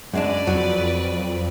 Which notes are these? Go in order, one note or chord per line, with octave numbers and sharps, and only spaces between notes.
F#2 G#3 D4 B4 D5
F2 F#3